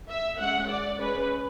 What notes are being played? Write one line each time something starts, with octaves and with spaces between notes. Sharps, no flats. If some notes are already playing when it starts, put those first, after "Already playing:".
E5
G#3 C#4 F#5
D5
G#3 C#4 B4